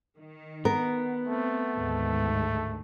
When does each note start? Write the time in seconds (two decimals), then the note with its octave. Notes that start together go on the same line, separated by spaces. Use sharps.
0.17 D#3
0.65 B3 A#4
1.28 A3 C4
1.74 D2 G#2 D#3